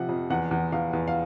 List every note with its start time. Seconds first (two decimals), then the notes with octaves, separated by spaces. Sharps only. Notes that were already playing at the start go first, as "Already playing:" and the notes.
Already playing: C3 F3 F#5
0.09 F2
0.30 E2 F#5
0.51 E2
0.72 E2 F5
0.93 E2
1.08 F5